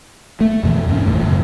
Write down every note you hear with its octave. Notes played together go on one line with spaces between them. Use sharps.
A3
F2 B2 E3
F2 G#2 C#4
A#1 D#2 A2
F1 F#2 C#3